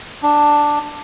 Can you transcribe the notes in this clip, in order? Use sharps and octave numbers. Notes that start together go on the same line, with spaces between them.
D4